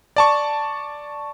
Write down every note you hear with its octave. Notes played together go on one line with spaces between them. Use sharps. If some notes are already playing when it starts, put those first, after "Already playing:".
D5 A5 C#6